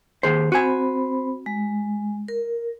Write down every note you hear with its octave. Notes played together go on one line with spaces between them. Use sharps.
D#2 G#4 C5
C4 F#4 C5 G#5 B5
G#3
A#4